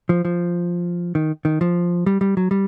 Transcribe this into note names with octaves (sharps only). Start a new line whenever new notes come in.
F3
F3
D#3
D#3
F3
G3
G3
F#3
G3